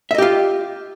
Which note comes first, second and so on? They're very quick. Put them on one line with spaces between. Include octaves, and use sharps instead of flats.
E5 D#5 G4 F4